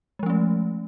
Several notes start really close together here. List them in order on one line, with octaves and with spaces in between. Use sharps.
G#3 F3 C#4 A3